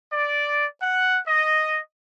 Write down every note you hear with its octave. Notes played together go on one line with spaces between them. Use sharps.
D5
F#5
D#5